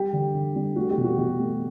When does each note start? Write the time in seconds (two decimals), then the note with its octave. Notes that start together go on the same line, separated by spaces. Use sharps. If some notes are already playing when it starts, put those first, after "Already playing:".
Already playing: G3 G4
0.13 D3
0.35 D3
0.56 G3
0.76 A3 F#4
0.90 G4
0.98 B2
1.04 F#4
1.18 B2 G4
1.39 A3